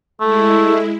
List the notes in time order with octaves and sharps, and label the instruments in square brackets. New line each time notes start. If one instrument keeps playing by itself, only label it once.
[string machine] G#3 E4 [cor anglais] A3 [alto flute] A4